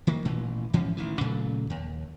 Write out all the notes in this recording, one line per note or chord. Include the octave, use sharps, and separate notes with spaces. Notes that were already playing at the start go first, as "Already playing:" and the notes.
D#3 A#3
A1 A#2 E3
G#2 E3 F3 C#4
A1 D#3 E3
A#2 C#3 F#3 A3
D#2